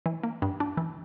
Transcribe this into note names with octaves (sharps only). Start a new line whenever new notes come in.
E3
A#3
G2
D4
E3